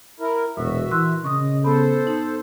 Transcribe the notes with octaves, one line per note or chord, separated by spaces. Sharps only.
E4 A#4
E1 A#2 F#4 E5
E3 C6 E6 F#6
C#3 D#5 C#6 D#6
B3 A4 C5 B5
D#4